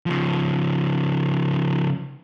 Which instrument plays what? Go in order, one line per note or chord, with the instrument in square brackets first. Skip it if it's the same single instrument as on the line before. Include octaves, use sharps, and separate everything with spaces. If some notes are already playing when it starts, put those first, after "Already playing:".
[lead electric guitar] C#3 F3